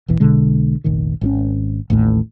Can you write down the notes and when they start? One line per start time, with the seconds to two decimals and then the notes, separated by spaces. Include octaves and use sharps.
0.08 E1 A#1 E3
0.20 B1 B2 D3 G#3
0.84 F1 A#1 D#3
1.21 G#1 D#3 C#4
1.90 A1 D#2 A2